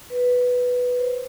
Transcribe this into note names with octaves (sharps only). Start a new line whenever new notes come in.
B4
C5